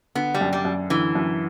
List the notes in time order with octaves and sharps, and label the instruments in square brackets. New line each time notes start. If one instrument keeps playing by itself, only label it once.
[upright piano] D3 [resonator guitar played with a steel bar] B3
[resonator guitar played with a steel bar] G3
[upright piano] F#2
[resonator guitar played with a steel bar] G3
[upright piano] F#2
[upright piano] D3 [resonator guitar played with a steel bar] E3
[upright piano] F#2